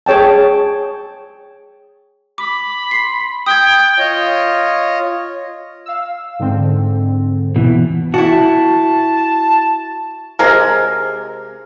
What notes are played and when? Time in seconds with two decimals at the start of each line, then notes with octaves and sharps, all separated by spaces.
0.06 G#4 C#5 G5 A5
2.38 B5 D6
2.91 C6 C7
3.46 G5 D#6 G#6
3.98 F4 C#5 D#5
5.86 F5 E6
6.39 G#2 D3 C4
7.56 B2 E3
8.14 E4 F#4 A5
10.39 C3 G#3 A#4